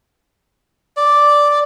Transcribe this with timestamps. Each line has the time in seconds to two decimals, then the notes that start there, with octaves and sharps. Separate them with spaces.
0.97 D5